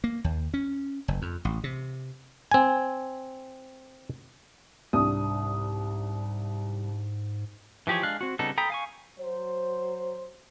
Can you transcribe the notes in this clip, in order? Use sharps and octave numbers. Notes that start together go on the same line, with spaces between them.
A#3
D#2
C#4
F#1
F2
A1
C3
C4 G#5
C2 G#2 D4 D#6
E3 F3 G4 G#4 C#5
G#3 D4 F5 F#6
C4 F#4
C#3 G3 B3 D#4 A4
A4 G5 A#5 B5 D#6
F5 G#5 C#6
F#3 C5